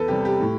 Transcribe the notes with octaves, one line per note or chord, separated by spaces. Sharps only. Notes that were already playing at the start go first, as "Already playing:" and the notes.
Already playing: E2 A4 B4
C3 G3 G4
G4
A2